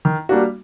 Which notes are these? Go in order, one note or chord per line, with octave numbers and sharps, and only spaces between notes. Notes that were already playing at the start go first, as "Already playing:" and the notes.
D#3
G3 A#3 D4 F#4